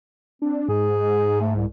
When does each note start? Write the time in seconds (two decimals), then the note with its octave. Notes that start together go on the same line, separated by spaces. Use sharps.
0.42 C4 D4
0.69 G#2 G#4
1.41 A3
1.55 C2